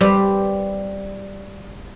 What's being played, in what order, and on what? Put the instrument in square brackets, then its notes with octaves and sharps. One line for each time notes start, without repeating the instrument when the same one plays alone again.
[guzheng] G3 C4 G4 B4